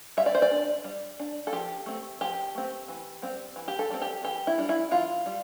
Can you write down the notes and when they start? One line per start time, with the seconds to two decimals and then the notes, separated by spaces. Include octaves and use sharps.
0.17 G3 E5
0.26 D5
0.35 C5
0.42 D5
0.51 D4
0.84 G3
1.19 D4
1.47 A4
1.53 F3 G4
1.86 A3 C4
2.21 F3 G4
2.55 A3 C4
2.88 E3
3.22 G3 C4
3.56 E3
3.68 G4
3.79 A4
3.90 G3 C4
4.02 G4
4.23 E3 G4
4.47 E4
4.58 G3 D4
4.69 E4
4.91 E3 F4
5.26 G3